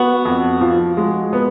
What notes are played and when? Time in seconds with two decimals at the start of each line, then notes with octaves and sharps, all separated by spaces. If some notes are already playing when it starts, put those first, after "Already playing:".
Already playing: B3 F#4
0.25 F2
0.61 F3
0.97 G#3
1.33 B3